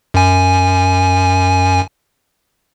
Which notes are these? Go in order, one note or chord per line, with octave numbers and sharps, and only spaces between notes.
F#2 G#5